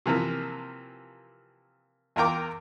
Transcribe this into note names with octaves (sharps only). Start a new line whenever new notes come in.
C3 E3 F3 A#3
E2 F4 A#4 G5 D6